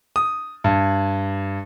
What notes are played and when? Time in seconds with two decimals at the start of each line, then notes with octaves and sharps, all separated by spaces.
0.16 D#6
0.64 G2